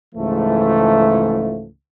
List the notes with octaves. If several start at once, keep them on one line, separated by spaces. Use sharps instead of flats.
C#2 G#2 E3 F3 A3